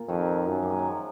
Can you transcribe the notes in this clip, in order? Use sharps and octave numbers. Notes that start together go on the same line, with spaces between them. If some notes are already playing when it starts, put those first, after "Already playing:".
Already playing: A#2
F2 D#3
F#2
A#3
G#3
F#3
F3